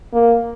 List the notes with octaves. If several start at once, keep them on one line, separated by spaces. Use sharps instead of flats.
A#3